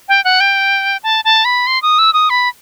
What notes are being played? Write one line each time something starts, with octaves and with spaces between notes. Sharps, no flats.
G5
F#5
G5
A5
A5
B5
C6
D#6
E6
D#6
B5